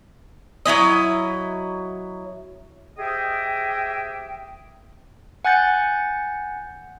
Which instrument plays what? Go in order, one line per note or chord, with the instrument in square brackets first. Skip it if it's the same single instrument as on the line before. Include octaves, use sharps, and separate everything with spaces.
[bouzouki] F#3 G#3 E4 D#5
[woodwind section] G4 G#4 C5 D#5 E5 G5
[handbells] F#5 G#5 F#6 G6 A6 C#7